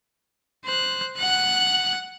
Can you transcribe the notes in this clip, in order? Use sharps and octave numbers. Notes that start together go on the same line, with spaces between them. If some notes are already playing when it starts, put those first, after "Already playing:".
C5 F#6
F#5 F#6